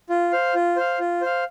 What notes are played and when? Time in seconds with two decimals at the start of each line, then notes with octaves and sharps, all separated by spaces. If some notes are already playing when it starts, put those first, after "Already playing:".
0.10 F4
0.32 C5 F5
0.55 F4
0.76 C5 F5
0.99 F4
1.21 C5 F5